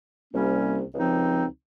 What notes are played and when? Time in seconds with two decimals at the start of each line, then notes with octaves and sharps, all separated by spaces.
0.32 C2 C3 G3 A#3 C#4
0.95 C#2 C3 F3 C4 D#4